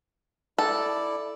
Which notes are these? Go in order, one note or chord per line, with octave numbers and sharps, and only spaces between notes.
E4 A4 D5